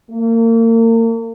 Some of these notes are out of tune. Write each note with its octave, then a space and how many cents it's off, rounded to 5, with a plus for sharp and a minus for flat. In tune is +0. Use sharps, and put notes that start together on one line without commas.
A#3 -35